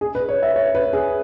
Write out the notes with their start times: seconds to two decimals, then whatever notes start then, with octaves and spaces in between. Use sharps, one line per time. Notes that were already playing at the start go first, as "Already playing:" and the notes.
0.01 G#4
0.15 B4
0.29 C#5
0.43 E5
0.56 C#5
0.75 B4
0.93 G#4